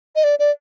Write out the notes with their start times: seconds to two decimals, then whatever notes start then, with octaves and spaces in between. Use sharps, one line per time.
0.16 D#5
0.24 D5
0.39 D5